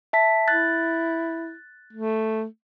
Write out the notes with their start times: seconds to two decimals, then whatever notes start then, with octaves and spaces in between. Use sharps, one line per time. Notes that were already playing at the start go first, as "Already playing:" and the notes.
0.13 E5 A5 B6
0.48 E4 F#6 A6
1.93 A3